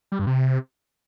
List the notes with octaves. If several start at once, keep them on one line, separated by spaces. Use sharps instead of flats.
G3
G2
C3